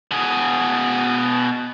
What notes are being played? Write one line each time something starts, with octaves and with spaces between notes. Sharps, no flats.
B2 G#4